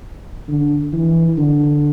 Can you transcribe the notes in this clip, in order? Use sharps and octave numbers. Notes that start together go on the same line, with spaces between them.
D3
E3
D3